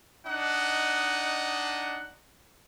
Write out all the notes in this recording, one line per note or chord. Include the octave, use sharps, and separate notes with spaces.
D4 D#4 D#5 F#5